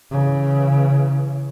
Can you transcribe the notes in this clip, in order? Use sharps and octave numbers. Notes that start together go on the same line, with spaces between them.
C#3 E3